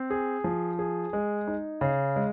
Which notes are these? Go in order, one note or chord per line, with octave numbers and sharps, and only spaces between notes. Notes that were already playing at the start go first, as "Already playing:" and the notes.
Already playing: C4
G#4
F3
G#4
G#3
D#4
C#3
G#3